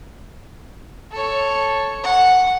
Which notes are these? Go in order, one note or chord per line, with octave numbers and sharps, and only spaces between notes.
A4 C#5
F#5